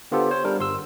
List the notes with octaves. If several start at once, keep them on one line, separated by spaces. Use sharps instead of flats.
D3 B3 F4 G4 A4 C5
C5 C#5
G3 D4 A#4
G1 C6 E6